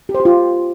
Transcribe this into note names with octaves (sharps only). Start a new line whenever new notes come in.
G4
C5
G4
F4